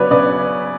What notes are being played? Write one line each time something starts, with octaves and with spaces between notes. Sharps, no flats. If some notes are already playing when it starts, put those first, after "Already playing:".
Already playing: C#3 F#3 B3 B4 C#5 D5
C#3 B4 D5